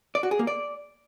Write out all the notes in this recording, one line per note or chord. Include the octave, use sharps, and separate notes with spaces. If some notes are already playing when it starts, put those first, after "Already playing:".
D5
F#4
G#4
A#3
D5